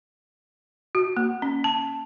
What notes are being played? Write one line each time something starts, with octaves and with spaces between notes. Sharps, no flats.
F#4
A#3
C#4
A5